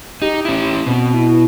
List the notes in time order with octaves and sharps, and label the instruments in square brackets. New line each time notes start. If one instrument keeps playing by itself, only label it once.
[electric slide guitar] D#4 [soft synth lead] G4
[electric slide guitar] C#4 E4
[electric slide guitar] B2 [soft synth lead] C4
[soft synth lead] E4